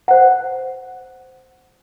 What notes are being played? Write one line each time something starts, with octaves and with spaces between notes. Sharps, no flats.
C5 F#5